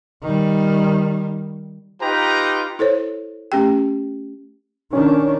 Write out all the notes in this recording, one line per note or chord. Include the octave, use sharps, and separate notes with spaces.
D#3 G3
D#4 F4 G4 B4 G5 A#5
E4 A4 C5 C#5
A3 C#4 G4 G5
D#3 C#4 D4